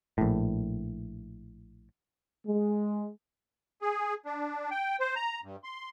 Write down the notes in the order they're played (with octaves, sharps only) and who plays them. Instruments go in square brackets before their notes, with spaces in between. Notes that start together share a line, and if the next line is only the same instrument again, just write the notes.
[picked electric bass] A#1 A2
[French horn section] G#3
[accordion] G#4
D4
G5
C5
A#5
G2
C6